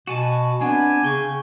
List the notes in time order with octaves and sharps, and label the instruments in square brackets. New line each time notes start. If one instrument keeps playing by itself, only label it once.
[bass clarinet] B2 [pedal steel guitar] F#4 G#5 A5
[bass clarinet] B3 [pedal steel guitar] C4 D4 [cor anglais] G#5
[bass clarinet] C#3 [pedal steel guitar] G5 C#6